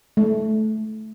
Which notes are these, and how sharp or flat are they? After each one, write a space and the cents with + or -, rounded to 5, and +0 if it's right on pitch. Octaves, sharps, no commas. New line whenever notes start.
A3 -20